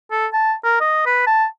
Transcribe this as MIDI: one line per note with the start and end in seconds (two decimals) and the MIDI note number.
0.11 0.27 69
0.33 0.54 81
0.64 0.78 70
0.80 1.02 75
1.06 1.24 71
1.27 1.45 81